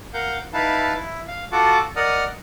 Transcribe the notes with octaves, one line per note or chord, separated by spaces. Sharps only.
A#4 F5 F#5 G6
D#4 E4 B4 F5 A5
E4
F5
F4 F#4 A4 F#5 A5 D6
A#4 D5 D#5 F#5 D#6 F6